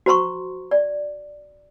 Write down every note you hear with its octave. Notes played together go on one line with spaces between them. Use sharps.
F#4 C5 A#5 C6 C#6
D5